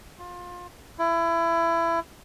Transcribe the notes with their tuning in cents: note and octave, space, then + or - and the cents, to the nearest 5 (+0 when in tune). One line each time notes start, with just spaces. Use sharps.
F4 +25
E4 +25